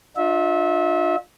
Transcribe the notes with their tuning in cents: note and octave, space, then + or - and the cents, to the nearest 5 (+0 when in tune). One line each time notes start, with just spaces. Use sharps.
D4 +45 F4 +30 E5 -25